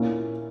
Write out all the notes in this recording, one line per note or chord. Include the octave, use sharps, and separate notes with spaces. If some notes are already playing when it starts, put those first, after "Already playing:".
Already playing: A#2 A#3 C#4 E4